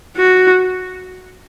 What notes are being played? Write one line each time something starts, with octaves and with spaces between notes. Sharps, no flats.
F#4